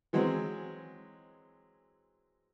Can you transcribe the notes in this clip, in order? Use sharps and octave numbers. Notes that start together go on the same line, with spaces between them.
E3 F#3 G#3 C4